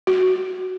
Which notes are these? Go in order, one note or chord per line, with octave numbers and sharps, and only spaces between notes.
F#4